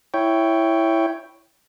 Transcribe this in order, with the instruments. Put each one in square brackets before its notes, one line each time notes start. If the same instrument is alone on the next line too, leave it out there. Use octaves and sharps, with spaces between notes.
[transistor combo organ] E4 C#5 G5